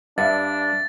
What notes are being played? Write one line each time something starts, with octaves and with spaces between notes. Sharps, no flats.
G2 D4 E5 F5 A6